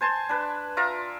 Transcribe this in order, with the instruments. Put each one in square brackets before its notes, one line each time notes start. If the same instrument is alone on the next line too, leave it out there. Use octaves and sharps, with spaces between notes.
[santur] C5 G#5 A5 C6
D4 B4
F4 D5 E5 A#5